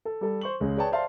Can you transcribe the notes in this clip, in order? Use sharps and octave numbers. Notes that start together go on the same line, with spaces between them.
A4
G3 A4
C5 C#6 F#7
C#2 G#3 C#4
G#4 B4 C#5 D5 G5 A5
C5 D5 E5 F5 A5 C6